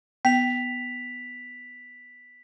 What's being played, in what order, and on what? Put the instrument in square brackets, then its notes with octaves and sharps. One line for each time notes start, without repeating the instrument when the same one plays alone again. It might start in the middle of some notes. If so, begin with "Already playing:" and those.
[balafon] B3 [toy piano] G5 [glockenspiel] B6 F7